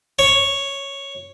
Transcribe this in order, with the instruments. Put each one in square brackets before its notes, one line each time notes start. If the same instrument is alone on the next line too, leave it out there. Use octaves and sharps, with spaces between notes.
[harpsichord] C#5